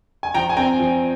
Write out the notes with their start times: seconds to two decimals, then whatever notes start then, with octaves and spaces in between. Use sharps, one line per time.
0.23 G#5
0.34 F3 G5 A#5
0.49 G#5
0.57 C4 G5 A#5
0.80 F3